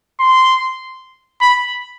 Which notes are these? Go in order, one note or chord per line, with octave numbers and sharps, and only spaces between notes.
C6
B5